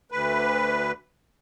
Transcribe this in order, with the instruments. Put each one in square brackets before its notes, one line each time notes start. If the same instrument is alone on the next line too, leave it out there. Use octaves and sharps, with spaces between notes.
[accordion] D2 B4